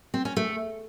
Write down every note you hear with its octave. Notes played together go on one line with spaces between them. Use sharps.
C4
C#4
A3